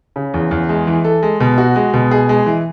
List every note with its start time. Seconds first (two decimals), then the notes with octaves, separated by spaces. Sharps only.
0.16 C#3
0.34 E2
0.51 E2
0.69 G#3
0.87 E3
1.05 A4
1.23 G#3
1.40 B2
1.58 F#4
1.76 G#3
1.94 B2
2.11 G#4
2.29 G#3
2.46 E3